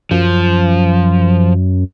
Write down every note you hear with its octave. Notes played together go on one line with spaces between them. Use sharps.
F#2 F3